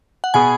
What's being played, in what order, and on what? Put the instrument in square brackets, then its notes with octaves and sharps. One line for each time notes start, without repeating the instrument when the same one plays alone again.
[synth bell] F#5
[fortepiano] B2 B3 G#4 [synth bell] G#5